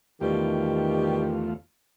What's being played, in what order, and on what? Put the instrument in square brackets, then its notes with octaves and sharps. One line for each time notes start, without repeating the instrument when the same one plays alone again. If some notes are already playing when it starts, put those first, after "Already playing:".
[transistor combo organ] E2 A3 F4 [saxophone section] B2 G3 G4 [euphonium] D#3